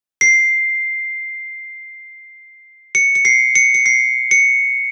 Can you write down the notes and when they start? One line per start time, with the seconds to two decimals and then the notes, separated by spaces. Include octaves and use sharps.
0.21 C7
2.95 C#7
3.15 C#7
3.25 C7
3.55 C#7
3.74 C#7
3.86 C7
4.31 C#7